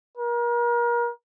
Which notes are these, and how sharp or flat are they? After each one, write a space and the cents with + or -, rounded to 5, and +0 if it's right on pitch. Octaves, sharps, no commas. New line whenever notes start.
A#4 +35